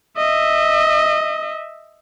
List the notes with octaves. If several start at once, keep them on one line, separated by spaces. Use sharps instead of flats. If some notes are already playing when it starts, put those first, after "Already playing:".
D#5 E5